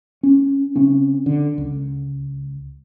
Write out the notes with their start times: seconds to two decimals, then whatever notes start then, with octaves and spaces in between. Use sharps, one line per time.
0.23 C#4
0.76 C#3 C4 C#4
1.26 D3
1.58 C#2